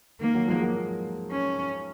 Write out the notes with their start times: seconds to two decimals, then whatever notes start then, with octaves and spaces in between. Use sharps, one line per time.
0.21 D#3 A#3
0.35 D#3 F#3
0.48 F3 G#3
0.62 F#3 A#3
1.31 C#4